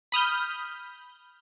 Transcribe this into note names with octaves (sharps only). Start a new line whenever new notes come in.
B5 D#6 F6 G6